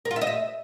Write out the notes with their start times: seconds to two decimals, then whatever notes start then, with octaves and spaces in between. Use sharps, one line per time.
0.05 A#4
0.11 F4
0.16 E5
0.21 D#5
0.27 E5